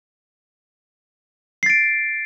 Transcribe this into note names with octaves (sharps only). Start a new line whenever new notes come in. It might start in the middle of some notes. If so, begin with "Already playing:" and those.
A6 C7 D7